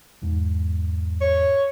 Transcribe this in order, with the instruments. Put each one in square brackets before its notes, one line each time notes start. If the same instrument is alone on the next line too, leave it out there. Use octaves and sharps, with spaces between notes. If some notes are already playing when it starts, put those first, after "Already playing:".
[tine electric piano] E2 G#2
[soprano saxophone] C#5